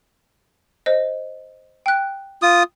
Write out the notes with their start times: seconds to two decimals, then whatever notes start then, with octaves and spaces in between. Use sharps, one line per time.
0.86 C5 D#5
1.86 G5 F#6
2.42 F4 D#6